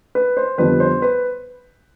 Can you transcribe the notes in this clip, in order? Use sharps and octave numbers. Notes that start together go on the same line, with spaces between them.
B4
C5
F2 D3 G3 B3 D4 B4
C5
B4